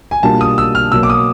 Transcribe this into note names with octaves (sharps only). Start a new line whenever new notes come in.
G#5
B2 G3 A#3 D4 F4 A5
D#6
E6
F6
B2 F#3 A#3 E6
D6
D#6